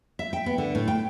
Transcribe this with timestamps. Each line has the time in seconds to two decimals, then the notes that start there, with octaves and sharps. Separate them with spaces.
0.19 E5
0.33 G5
0.46 B3
0.58 D3
0.75 A2
0.88 G5